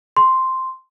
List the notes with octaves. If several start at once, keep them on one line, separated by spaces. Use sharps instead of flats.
C6